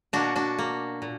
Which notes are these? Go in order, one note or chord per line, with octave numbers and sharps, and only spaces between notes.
B2 A#3 D4 F#4
D4 F#4
A#3
A#2